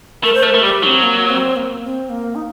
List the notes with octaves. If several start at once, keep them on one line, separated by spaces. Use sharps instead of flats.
A3 A#4
C5
A3 A#4
A3
G3 G4
F#3 C4 D#4
A#3
C4
A#3
C4
A#3
D#4